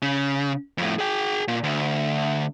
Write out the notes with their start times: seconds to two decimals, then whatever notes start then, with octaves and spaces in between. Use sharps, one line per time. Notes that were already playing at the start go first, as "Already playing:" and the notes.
0.02 C#3
0.78 F2 A2
0.99 G#4 G5
1.48 A#2
1.64 D2